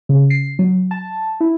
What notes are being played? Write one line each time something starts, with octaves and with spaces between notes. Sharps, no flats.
C#3
C7
F#3
A5
E4